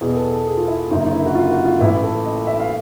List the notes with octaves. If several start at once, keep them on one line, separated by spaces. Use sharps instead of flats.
E2 B2 G#4
A4
A4
G#4
F4
E4
F#1 F#2 D3 D#4
D#4
E4
F#4
F4
F#4
F4
A1 A2 E3 E4
A4
D#5
E5
F5